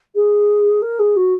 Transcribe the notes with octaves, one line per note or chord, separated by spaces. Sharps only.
G#4
A#4
G#4
F#4